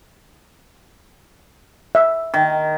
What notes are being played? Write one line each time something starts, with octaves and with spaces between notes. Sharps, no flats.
E5
D#3